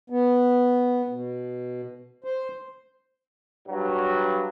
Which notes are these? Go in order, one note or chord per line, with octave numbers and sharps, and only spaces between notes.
B3
B2
C5
G2 F#3